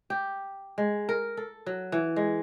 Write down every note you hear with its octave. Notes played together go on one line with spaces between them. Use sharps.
G4
G#3
A#4
A4
F#3
E3
G#3